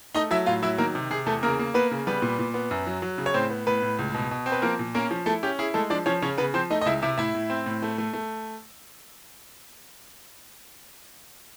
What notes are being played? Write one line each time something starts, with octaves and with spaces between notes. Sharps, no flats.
A3 D#4 D#5
F#3 E4 E5
A2 F4 F5
F#3 E4 E5
D#3 A#3 A#4
C3
C3 G#4
E2 A3 A4
C#3 A#3 A#4
A#3
A#3 B3 B4
C#3
G3 B3 B4
A#2
A#2
B3
F#2
F#3
F#3
C#3
C#5
A2 C4 C5
B3
A2 B3 B4
A2
C#2
B2
B2
C4
B4
F3 A#3 A#4
A#2
A#3 C#4 A#4
F3
A3 E4 A4
C#4 G4
E4 G#4
G#3 A3 A4
F3 D4 D5
F3 C#4 C#5
C#3 C#4 C#5
C#3 B3 B4
F3 C4 C5
A3 D#4 D#5
D#5
C#2 E4 E5
C3 E4 E5
A2 E4 E5
A2
C4
A2
A3
A3
A3